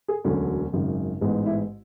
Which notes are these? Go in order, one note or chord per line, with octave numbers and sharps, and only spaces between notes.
G#4
E1 D2 D3 F#3 C#4
G#1 F#2 C#3
A1 G#2 G#3 B3
E4